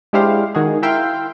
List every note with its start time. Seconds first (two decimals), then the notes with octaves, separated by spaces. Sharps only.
0.13 G#3 D4 E4 G4 C5 F5
0.55 D#3 F#4 G#4
0.82 E4 A#4 E5 F5 G5 C6